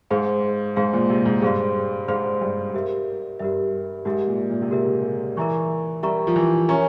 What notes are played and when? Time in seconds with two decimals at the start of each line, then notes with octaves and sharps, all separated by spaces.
0.10 G#2 G#4 C5 F5 C6
0.76 G#2 G#4 C5 F5 C6
0.93 A#2
1.10 C3
1.26 G#2
1.42 G2 G#4 C5 F5 C6
2.08 G#2 G#4 C5 F5 C6
2.41 G2
2.74 G4 A#4 E5
3.39 G2 G4 A#4 E5
4.05 G#2 G4 A#4 E5
4.27 A#2
4.50 A#2
4.62 C3
4.71 C#3 G4 A#4 E5
5.37 E3 A#4 E5 A#5 C#6
6.03 G3 A#4 E5 A#5 C#6
6.27 F3
6.36 E3
6.69 C#4 A#4 E5 A#5 C#6